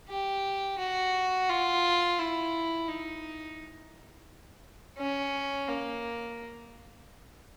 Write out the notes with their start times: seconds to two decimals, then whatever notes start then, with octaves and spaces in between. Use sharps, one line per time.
0.09 G4
0.78 F#4
1.49 F4
2.18 E4
2.88 D#4
4.98 C#4
5.68 A#3